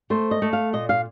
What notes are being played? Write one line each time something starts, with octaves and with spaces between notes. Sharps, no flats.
A3 C5
D#5
A3
F5
A#2 D#5
F5